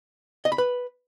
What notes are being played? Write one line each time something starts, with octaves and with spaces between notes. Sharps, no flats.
D#5
B5
B4